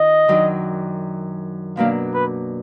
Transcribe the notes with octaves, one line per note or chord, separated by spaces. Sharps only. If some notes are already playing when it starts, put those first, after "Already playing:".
Already playing: D#3 F4 D#5
F#2 D#3 F#3 D4
B2 F#3 A#3 D4 F5
B4